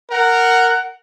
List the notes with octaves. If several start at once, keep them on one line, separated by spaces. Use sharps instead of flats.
A#4 F#5